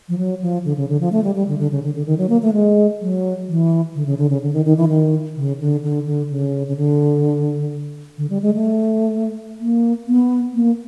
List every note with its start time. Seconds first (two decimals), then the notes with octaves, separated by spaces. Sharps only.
0.09 F3
0.18 F#3
0.42 F3
0.64 D3
0.77 C#3
0.89 D3
1.01 F3
1.12 A3
1.24 G3
1.35 G3
1.48 D3
1.59 D3
1.71 C#3
1.83 D3
1.94 D3
2.06 D#3
2.18 F#3
2.29 A#3
2.42 A3
2.53 G#3
3.01 F#3
3.48 E3
3.95 D3
4.06 C#3
4.18 D3
4.30 C#3
4.42 D3
4.53 D#3
4.65 D#3
4.77 E3
4.89 D#3
5.36 C#3
5.60 D3
5.83 D3
6.06 D3
6.30 C#3
6.68 C#3
6.77 D3
8.18 D3
8.30 G3
8.42 G#3
8.54 A3
9.60 A#3
10.06 B3
10.54 A#3